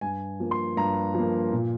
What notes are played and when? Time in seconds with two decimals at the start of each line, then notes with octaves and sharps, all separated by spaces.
0.01 G2 G#5
0.40 F3 A#3
0.51 C6
0.77 G2 A#5
1.14 F3 A#3
1.52 A#2